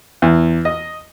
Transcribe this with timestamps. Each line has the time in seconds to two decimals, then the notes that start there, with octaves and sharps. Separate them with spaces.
0.22 E2
0.65 D#5